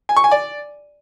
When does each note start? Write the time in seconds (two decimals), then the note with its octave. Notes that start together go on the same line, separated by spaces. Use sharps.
0.09 G#5
0.17 C#6
0.24 G#5
0.31 D5